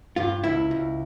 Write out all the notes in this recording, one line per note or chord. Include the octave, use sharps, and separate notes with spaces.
G2 F4
C#2 E4
C#2